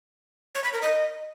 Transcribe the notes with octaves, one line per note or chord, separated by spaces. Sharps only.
C#5
B5
A#4
D#5